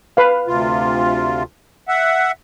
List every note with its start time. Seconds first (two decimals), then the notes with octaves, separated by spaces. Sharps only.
0.17 B4 F5
0.47 D2 C3 F4
1.88 E5 F#5